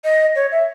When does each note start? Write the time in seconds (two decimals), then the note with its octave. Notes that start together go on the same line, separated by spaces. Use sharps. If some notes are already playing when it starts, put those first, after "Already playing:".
0.04 D#5
0.35 C#5
0.51 E5